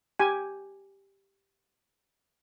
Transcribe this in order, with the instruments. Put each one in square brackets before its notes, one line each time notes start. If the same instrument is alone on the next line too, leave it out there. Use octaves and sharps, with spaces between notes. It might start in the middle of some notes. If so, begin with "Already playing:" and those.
[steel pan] G4 G#5